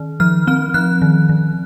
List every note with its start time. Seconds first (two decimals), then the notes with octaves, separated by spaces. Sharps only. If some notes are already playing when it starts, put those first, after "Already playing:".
Already playing: D#3
0.20 F3 F6
0.47 C4 F6
0.74 F3 F#6
1.02 D#3
1.29 D#3